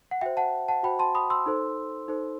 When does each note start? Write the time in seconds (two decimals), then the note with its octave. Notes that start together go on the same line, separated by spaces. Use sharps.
0.11 F#5
0.21 F#4 C5 E5 G5
0.37 F#5 A5
0.68 F#5 A5
0.83 F#4 C5 G5 B5
0.99 A5 C6
1.15 B5 D#6
1.30 C6 E6
1.46 D#4 A4 C5
2.08 D#4 A4 C5